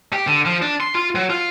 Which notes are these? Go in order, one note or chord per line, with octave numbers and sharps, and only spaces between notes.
G4
D3
F3
D4
C6
F4
F#3
F4